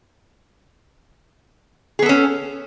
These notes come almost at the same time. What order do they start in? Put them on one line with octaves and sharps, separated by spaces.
G#4 B3 A4 C#4